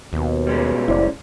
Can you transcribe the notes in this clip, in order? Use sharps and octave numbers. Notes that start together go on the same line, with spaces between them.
D#2 B2
G3 G#3 C#4
F#1 E4 C5 D5